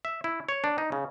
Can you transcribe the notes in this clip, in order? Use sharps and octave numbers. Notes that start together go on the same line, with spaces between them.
E5
E4
C#5
D4
D#4
C#3